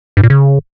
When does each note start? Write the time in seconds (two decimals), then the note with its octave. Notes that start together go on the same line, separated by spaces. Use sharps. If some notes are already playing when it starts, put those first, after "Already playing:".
0.17 G2
0.23 A#2
0.30 C#3